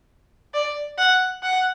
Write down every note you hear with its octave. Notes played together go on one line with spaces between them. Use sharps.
D5
F#5
F#5